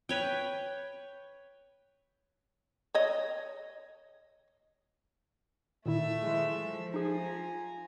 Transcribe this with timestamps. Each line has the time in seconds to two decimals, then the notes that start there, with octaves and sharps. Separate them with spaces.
0.09 B4 C#5 G5
2.94 C#5 D#5
5.86 A#2 D#3 A3 E4 E5
6.21 E3 G#3
6.52 F3
6.94 D#4 G#4 G#5 A#5